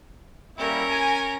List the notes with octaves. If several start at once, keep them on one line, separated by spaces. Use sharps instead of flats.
G3 A#3 C#4 E4 A#4
G#5